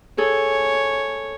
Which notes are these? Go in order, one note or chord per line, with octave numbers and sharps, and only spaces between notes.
G#4 A4 C#5